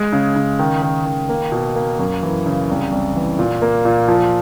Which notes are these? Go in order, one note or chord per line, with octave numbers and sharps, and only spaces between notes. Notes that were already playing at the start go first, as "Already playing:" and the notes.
Already playing: G#3
C#3
C#3
D#3
D#3
D#3
A#3
B2
A#3
F#2
E3
C#3
C2
C2
E3
A#2
A#3
A#2
F3